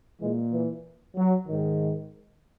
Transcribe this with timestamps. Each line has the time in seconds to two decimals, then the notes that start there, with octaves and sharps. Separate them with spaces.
0.21 A#2 E3 G#3
0.52 E3
1.16 F#3
1.47 G#2 D#3